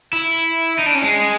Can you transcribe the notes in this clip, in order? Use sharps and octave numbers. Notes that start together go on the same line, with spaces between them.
E4
D#4
D4
C#4
G#3